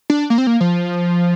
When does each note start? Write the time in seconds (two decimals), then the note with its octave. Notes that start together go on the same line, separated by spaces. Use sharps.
0.10 D4
0.30 A#3
0.38 C4
0.47 A#3
0.61 F3